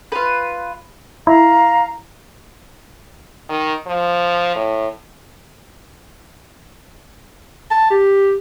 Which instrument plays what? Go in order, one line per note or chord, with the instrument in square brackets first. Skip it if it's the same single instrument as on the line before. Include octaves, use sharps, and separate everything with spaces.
[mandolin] F4 B4
[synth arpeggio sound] E4 [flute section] F5 A#5
[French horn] D#3
F3
A2
[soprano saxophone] A5
G4